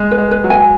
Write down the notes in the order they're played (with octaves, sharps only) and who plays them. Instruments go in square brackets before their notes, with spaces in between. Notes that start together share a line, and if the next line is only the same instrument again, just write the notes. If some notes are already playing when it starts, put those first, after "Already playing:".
Already playing: [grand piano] G#3
[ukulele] B4
[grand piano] G#3
[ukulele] B4
[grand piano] F#3
[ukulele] G#5